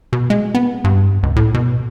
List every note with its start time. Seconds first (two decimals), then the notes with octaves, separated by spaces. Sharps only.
0.13 B2
0.30 G#3
0.54 B3
0.84 G2
1.23 C#2
1.36 A2
1.54 B2